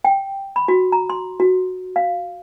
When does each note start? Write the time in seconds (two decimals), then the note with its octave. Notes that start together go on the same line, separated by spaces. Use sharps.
0.04 G5
0.56 B5
0.68 F#4
0.92 A#5
1.10 C6
1.40 F#4
1.96 F5